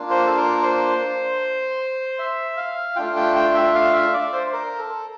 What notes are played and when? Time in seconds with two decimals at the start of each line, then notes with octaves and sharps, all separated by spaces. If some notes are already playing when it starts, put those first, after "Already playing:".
Already playing: A#3 D4 F4
0.10 C5
0.26 A4
0.37 A#4
0.62 C5
2.19 E5
2.57 F5
2.96 A3 D4 F4 G5
3.16 G5
3.35 G5
3.54 E5
3.75 F5
3.93 E5
4.14 D5
4.33 C5
4.47 C5
4.53 A#4
4.78 A4